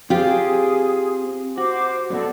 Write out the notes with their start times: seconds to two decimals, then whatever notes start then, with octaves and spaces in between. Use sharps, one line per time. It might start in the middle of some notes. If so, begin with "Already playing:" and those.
0.10 C4 F4 G4 G#4 C5
1.58 F#4 C5 D6
2.10 F#2 B2 F#4 A4 D5